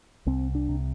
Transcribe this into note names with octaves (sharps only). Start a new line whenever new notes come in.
C2 C4
D4
C3